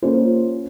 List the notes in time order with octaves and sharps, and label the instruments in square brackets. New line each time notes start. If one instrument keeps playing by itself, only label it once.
[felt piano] A#3 C#4 F4 C5